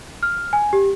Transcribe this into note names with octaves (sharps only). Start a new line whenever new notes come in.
F6
G#5
G4